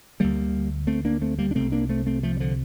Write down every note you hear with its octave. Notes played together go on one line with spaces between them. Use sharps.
D2 D3 G3 A#3
A3 C4
A#3 D4
A3 C4
G3 A#3
D4
C2 C3 A3 C4
A#3 D4
A3 C4
A3 C4
F3 A3
G3
D3 F3